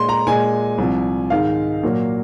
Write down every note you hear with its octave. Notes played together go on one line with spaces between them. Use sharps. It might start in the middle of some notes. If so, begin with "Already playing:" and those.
Already playing: A#2 G#3 C6
A#5
A#2 G#3 G#5
C2 C3 F3
G#2 D#3 G#3 F5
A#2 F#3 A#3